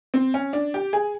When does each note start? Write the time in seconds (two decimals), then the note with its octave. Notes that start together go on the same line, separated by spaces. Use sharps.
0.14 C4
0.34 C#4
0.53 D4
0.74 G4
0.93 G#4